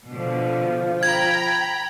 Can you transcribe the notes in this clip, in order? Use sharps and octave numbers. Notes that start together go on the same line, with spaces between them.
B2 D3 F3
G5 A#5 B5 G#6